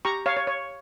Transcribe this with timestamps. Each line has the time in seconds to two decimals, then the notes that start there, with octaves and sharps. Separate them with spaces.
0.05 G4 A#5 C#6
0.26 C#5 F5
0.37 C#5
0.47 C#5